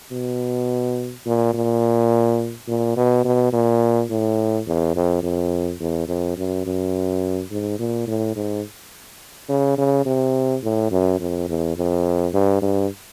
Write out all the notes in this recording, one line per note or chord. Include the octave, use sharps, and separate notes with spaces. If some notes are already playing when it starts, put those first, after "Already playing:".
B2
A#2
A#2
A#2
B2
B2
A#2
A2
E2
F2
F2
E2
F2
F#2
F#2
G#2
A#2
A2
G#2
C#3
C#3
C3
A2
F#2
F2
E2
F2
G2
G2